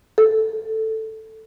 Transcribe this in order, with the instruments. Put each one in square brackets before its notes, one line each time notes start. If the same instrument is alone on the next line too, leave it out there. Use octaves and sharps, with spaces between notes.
[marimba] A4